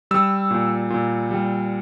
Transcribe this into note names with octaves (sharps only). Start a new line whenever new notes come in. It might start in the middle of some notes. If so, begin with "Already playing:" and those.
G3 E6
A#2
A#2
G3